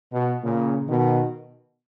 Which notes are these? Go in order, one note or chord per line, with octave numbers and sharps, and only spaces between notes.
B2
A#2 C#3
B2 D#3